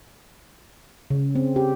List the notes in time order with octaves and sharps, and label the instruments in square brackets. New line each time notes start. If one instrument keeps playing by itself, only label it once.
[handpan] C#3
C4
G4